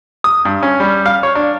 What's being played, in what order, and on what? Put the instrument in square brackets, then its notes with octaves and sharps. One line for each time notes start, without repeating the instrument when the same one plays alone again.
[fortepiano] D#6
G2
C#4
G3
F5
C#5
D4